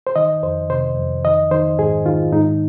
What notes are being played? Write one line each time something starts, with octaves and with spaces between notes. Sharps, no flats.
C5
D#3 D#5
F2 C5
C3 C5
F2
D#3 D#5
D#3 C5
G#2 G#4
D#3 F4
G#2 D#4